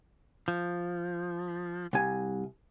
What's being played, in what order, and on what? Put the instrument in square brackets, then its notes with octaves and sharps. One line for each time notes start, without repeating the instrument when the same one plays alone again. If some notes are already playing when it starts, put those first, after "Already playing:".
[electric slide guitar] F3
[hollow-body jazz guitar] C2 G#5